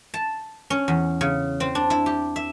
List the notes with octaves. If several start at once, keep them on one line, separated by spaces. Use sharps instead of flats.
A5
C#4
E2
C#3
C4
D4
E4
G4
E5